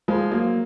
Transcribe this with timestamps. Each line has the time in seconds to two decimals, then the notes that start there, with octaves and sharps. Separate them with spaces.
0.08 F3 G#3
0.31 F#3 A#3